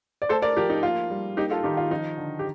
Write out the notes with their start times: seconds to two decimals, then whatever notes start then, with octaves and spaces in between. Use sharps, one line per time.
0.22 D5
0.29 A3 A4 C5
0.42 A#4 D5
0.57 F3 G4 A#4
0.70 D#4
0.83 A#3 F4
1.11 G3
1.37 A#3 D#4 G4
1.50 F4 A4
1.63 D#3 D#4 G4
1.77 F4
1.90 F3 D#4
2.18 D3
2.39 G4